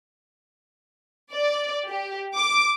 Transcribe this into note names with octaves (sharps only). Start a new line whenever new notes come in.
D5
G4
D6